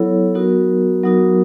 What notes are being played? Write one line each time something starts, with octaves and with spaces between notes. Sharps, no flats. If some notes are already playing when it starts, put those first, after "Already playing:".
Already playing: F#3 B3 E4 A4 C#5
F#3 B3 D#4 F#4 A#4
F#3 B3 D#4 F#4 A#4